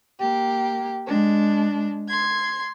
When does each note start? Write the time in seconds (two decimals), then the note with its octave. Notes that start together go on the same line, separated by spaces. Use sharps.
0.20 A#3 G4
1.06 G#3 D4
2.08 C6 G#6